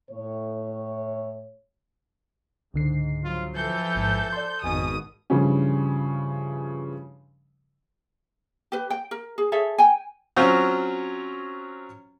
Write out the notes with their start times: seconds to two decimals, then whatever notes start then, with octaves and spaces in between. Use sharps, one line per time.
0.11 A2 C#5
2.74 C#2 G#2 D3 C7
3.24 F3 F#3 F4
3.56 E3 F3 A4 G6
3.95 A1 G#2
4.32 D5 C6
4.64 G#1 F2 B2 G#5 D#6
5.30 G2 C#3 E3 F3 G3 C#4
8.72 G4 B4
8.90 G5
9.11 A#4
9.38 G#4
9.52 G#4 A4 C#5 E5
9.78 G5 G#5
10.36 F#3 C4 C#4 F4 F#4